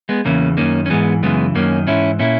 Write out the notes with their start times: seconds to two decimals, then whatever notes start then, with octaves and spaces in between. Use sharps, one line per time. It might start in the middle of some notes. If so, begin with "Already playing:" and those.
0.09 G#3 B3
0.25 E2 C#3 E3 A#3 C#4
0.57 F#2 D#3 A#3 C#4
0.86 C#4
0.90 G#2 E3 G#3 B3
1.23 F#2 C#3 E3 G#3 B3
1.55 F#2 D#3 A#3 C#4
1.87 G#2 E3 C#4 E4
2.19 A#2 C#4 E4